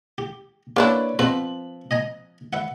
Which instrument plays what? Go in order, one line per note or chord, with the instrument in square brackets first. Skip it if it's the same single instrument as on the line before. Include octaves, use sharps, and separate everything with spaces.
[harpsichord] G4
[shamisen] A#3 D4 E4 [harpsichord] G4 [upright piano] B4 C#5 D5
[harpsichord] B2 [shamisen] F3 C4 B4 [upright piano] F#7
[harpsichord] D#5 G#5 A#5
B4 E5 F#5